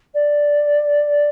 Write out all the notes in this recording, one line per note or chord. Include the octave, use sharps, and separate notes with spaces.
D5